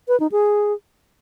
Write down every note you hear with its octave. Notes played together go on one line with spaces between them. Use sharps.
B4
D#4
G#4